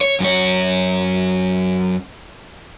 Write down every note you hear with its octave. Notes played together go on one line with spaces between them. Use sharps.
C#5
F#2 C#5